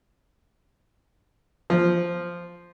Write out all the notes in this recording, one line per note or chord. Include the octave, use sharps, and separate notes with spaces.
F3